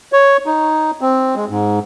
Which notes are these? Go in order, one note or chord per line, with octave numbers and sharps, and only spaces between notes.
C#5
D#4
C4
G#3
G#2